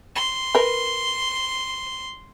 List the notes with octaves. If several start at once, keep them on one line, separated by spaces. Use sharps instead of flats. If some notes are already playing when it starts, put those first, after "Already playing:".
C6
A#4 B4